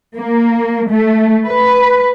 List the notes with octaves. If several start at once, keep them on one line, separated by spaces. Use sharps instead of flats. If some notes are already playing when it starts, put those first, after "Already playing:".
A#3
A3
B4